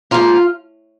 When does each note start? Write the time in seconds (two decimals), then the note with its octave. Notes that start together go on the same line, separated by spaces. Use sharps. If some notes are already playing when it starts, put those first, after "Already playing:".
0.11 G#2 F3 A#3 F4